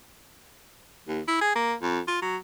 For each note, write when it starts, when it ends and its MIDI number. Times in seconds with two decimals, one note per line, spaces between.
1.08 1.21 39
1.28 1.40 64
1.42 1.52 68
1.56 1.74 58
1.82 2.00 41
2.08 2.18 65
2.22 2.37 54